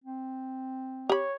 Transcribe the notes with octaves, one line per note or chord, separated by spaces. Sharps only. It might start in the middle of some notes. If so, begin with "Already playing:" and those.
C4
G4 C#5 B5